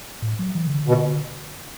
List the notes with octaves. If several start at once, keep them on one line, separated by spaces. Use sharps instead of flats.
A2
F#3
E3
C#3
D3
B2